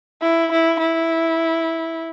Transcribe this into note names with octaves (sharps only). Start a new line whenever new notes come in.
E4
E4
E4